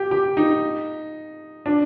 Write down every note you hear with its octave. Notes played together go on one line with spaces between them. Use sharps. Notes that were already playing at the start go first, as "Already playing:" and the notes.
Already playing: G4
G4
D#4
D4